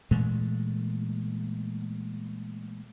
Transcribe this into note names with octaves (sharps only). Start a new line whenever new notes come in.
A#2 E3 G#3 A3